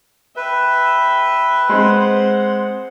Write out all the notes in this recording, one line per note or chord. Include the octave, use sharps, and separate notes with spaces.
B4 E5 G5
G#3 C4 C5 F#5